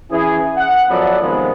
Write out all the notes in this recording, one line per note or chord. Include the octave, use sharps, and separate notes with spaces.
E3 C#4 E4 G#4
F#5
F#2 F3 F#3 B3 A4 D5
C3 D#3 F3 G#3 B3